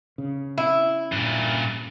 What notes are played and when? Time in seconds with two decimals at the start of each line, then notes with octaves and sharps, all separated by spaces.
0.18 C#3
0.58 E4 E5
1.12 G2 A#2